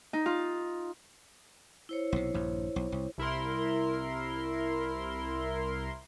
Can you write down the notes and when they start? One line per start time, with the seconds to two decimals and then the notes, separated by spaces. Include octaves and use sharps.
0.13 D#4
0.26 F4
1.89 E4 C5 C#5
2.13 B1 C3
2.34 A#1 G2
2.76 B1
2.92 C2
3.18 C2 E4 A#4 C6